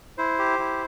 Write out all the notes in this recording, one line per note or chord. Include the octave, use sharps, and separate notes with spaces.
E4 C5
G4
E4